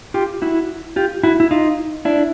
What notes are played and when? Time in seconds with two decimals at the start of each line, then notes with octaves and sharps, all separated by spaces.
0.14 F4 G4
0.42 E4 F#4
0.96 F4 G4
1.23 E4 F#4
1.40 E4
1.51 D#4 F4
2.05 D4 E4